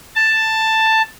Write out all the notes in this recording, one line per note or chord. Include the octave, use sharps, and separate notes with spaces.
A5